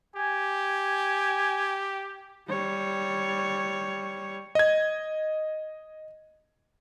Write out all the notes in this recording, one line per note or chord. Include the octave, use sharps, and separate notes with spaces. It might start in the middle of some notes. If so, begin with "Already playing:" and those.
G4 G#5
G3 C#5
D#5 G#6